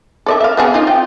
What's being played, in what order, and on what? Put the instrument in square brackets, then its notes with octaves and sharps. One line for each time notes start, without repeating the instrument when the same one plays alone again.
[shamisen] A4 D5 E5
E5 F5
B3 G#4 A4
D#4 F4
C4 F4 G5